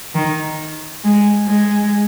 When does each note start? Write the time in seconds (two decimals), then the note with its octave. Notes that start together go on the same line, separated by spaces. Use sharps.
0.15 D#3
1.04 G#3
1.47 G#3